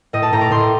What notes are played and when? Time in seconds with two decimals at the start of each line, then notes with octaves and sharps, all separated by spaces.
0.13 A2 D#5
0.22 A5
0.33 A2 A#5
0.41 D6
0.51 A2 C6